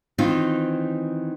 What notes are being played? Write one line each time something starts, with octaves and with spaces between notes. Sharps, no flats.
D#3 E3 C4 D#4 F4